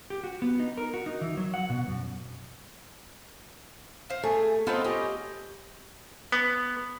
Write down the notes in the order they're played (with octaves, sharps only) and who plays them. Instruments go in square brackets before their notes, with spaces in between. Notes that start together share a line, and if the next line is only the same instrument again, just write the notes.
[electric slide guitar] G4
F#4
B3
D#4
A#4
F#4
D#4
E3
F#3
F#5
B2
F#2
[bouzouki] C5 F5
[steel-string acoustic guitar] A3 [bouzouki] G#4
[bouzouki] B3 D#4 A4 [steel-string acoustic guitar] C4 F4
[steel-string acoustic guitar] C#4 [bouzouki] G4 D#5
[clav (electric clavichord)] B3